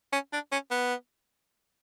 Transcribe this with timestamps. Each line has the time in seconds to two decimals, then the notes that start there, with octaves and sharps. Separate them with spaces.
0.13 C#4
0.33 D4
0.52 C#4
0.71 B3